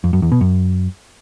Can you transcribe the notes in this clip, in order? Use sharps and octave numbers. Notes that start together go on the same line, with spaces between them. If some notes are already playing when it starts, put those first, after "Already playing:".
F2
F#2
E2
B2
F#2